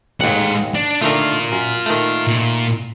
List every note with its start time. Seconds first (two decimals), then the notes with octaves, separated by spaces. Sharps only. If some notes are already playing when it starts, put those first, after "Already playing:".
0.21 A1 D#2 G#3 F#5
0.74 D4
1.02 D3 D#3 A3 F4 A#4
1.52 F#2
1.86 D#3 A3
2.27 A#2